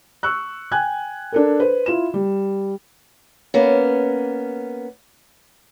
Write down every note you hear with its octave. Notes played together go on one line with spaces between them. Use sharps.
C#6 E6 F#6
G5 G#5 F#6 G#6
D4 A4 A#4
B4 C5
E4 F4 E7
G3
A#3 B3 C#4